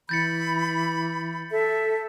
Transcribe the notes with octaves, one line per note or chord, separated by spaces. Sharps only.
E3 B5 G6 A6 C#7
A4 E5